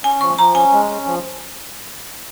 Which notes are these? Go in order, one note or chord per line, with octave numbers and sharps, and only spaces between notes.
C#4 G#5
F3 C#6
F3 A#5
C#4 G#5
G#3
C#4
F3